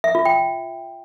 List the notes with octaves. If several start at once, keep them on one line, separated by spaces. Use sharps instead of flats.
E5
F4
G5